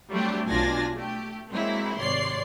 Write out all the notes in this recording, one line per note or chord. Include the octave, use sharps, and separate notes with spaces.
F#3 G3 A3 C4 D4 G4
B1 D4 F4 G#5 A6 A#6
A3 G4
F#3 G#3 A#3 C4 E4
G#1 C3 C#5 D5 C6 C7